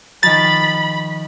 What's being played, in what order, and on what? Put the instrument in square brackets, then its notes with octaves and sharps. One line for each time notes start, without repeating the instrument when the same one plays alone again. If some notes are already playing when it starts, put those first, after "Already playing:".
[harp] D#3 F3 [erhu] B5 [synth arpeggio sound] A6